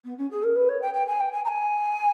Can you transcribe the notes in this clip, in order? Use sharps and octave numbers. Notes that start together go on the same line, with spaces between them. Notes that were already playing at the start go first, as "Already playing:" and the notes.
B3
C#4
G#4
A#4
B4
C#5
G5
G5
G#5
G5
G#5
A#5
G#5